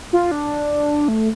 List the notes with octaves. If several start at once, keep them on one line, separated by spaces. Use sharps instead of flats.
F4
D4
A3